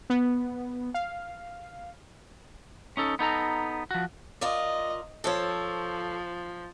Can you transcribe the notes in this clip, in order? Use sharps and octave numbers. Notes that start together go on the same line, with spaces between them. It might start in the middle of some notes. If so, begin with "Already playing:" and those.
B3
F5
C#4 D#4 A4
B3 D#4 A4 A#5
F3 F#4
F4 A#4 D5 D#5
F3 A4 C5 C#5